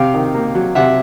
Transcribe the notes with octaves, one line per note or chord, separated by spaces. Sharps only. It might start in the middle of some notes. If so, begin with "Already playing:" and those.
Already playing: C3 F5 G5
D#3
A#3
F#3
C3 E5 F#5